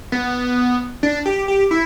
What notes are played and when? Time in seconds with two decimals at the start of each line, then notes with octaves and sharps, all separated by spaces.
0.12 B3
1.03 D4
1.26 G4
1.48 G4
1.71 E4